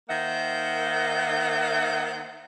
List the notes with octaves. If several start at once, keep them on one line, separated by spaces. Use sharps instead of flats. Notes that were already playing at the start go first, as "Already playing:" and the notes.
D#3 A#3 C5 E5 F#5